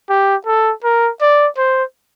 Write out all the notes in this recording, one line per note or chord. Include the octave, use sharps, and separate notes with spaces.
G4
A4
A#4
D5
C5